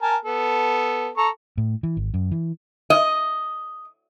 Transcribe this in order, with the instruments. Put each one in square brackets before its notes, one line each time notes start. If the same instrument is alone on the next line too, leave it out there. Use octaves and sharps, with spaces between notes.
[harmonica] A#4 G#5 A5
B3 A4
A4 A#5 C#6
[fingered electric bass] A2
E3
G#1
F#2
E3
[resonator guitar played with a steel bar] D#5